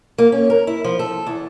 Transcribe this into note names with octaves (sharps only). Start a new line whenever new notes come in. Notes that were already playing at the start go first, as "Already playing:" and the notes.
A#3
C#4
A#4
E4
F3
A4
E2